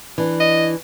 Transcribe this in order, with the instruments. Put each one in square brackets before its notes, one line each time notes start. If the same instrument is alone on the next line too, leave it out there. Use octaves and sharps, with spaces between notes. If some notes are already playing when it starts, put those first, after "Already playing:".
[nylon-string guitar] E3 D4
[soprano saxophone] D#5